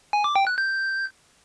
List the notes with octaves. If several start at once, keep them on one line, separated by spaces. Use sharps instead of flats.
G#5
D6
G5
F#6
G6